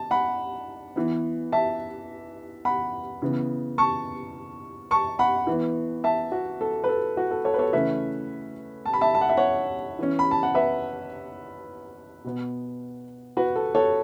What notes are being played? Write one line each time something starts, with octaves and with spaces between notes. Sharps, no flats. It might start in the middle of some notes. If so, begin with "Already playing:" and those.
Already playing: A5
F#5 B5
E3 B3
E5 A5
F#5 B5
C#3 E3 B3
A5 C#6
A5 C#6
F#5 B5
E3 B3
E5 A5
F#4
A4
B4
A4
F#4
A4
A4 C#5
B4
A4 C#5
C#3 E3 A3 C#4 B4 E5
A5
B5
E5 A5
A5
F#5
E5
C#5 F#5
E3 C#4
B5
A5
F#5
B4 E5
B2 B3
F#4 B4
A4
A4 C#5